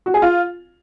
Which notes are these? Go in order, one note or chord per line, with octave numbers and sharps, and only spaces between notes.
F#4
G#4
F4